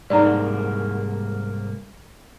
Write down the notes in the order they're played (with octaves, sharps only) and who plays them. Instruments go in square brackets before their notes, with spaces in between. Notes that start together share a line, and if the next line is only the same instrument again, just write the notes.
[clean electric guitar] C2 G#2 A#3 [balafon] D#4 D5